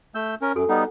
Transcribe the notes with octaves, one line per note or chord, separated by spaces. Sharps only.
A3 E6 G6
C#4 A#4
F#2 F#4 A4 G#5
G3 B3 D#4 F#5